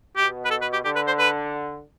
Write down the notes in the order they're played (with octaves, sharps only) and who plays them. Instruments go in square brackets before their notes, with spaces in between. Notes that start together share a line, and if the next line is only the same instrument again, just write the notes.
[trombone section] B2 [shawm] G4
[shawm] B4
A4
B4
G4
[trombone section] D3 [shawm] G4
[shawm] B4
C5
B4